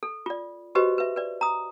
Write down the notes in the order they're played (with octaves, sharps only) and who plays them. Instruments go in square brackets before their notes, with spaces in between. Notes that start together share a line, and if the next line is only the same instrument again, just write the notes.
[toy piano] A4
F4 D5
F#4 G4 B4 C5 D#5
B4 E5
B4 D5
A#5 D#6